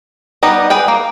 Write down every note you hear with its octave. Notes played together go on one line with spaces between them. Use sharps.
G3 B3 D#4 G4 D#5
G#4 B4 G5
A#3